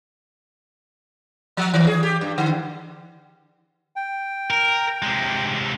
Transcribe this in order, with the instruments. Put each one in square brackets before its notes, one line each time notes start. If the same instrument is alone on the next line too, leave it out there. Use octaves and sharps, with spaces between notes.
[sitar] F3
D#3
G#4
G4
G2
D3
[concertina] G5
[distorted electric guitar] A#4
C3 G#3